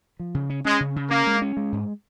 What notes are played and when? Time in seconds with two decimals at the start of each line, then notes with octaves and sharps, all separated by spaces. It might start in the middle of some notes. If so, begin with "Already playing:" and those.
0.20 F3
0.34 C#3
0.50 C#4
0.65 G#3 C#4
0.80 C#3
0.96 C#3
1.10 A#3 C#4
1.27 G#3
1.42 C#4
1.57 G#3
1.72 G#2